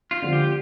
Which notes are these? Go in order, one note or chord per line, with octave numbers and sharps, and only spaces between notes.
F4
D3 F3
G4